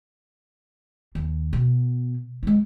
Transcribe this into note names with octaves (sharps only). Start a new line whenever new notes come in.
D#2
B2
G#3 E4